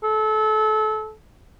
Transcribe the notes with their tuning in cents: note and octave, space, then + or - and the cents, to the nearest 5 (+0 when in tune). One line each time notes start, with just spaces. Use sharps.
A4 -25